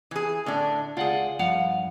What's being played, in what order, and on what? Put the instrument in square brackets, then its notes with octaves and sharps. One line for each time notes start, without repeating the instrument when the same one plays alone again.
[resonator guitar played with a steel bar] E3 G#4
[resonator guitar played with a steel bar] A2 D4 [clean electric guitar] D3
[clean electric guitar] C#2 D5 F#5 [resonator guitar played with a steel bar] F4 G#4
[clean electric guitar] G2 F3 F5 [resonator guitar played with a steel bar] F#5